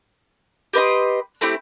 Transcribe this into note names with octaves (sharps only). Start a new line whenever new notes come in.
G4 B4 D#5 C6
A3 C4 E4 G4